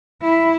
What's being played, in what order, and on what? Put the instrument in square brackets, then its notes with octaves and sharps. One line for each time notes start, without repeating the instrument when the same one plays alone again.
[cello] E4